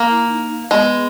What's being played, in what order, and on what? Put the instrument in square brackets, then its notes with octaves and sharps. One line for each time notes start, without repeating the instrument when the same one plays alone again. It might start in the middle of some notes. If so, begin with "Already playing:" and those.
Already playing: [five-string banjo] A#3
[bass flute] E4
D#4
[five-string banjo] G#3 [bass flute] B3